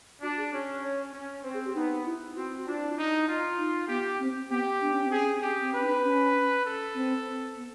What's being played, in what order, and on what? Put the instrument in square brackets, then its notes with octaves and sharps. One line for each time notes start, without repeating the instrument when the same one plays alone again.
[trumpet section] D4 [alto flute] F#4
[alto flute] G#4
[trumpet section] C#4 [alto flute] C#5
[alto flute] C#5
[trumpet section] C#4
[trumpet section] C4 [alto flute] C5
[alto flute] G#4
G4
[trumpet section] B3 [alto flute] D#4
[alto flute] E4
[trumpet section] C4 [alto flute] F#4
[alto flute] F#4
[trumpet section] D4 [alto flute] F4
[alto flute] E4
[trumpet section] D#4
F4
[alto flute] D#4
[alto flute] B3 [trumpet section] G4
[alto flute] C4
[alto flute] B3 [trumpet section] G4
[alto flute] D4
C#4
C4
[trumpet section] G#4
[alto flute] C#4
[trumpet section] G4
[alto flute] C4
[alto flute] C#4 [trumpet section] B4
[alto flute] D#4
D4
C#4
[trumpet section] A4
[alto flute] C4
B3